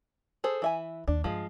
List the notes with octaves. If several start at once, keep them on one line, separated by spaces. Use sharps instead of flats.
G#4 A4 C5
E3 E5 G#5
D#2 D4
G2 F3 G#3